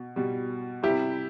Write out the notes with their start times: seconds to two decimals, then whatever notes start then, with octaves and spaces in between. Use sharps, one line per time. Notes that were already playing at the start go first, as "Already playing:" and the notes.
Already playing: B2
0.16 B2 G3
0.83 C3 G3 E4 G4